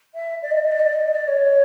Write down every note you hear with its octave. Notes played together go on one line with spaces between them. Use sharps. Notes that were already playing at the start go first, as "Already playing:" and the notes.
E5
D5
D#5
D5
D#5
D5
D#5
D5
D#5
D5
D#5
D5
C#5